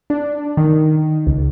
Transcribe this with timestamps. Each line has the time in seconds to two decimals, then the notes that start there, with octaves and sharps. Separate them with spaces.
0.10 D4
0.57 D#3
1.27 C#2